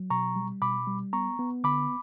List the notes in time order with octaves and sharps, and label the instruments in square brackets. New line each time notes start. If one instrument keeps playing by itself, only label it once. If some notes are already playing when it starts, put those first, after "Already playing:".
Already playing: [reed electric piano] F#3
B2 A#5 C#6
G3
B2 B5 D6
G3
B3 A#5 C#6
B3
D3 B5 D6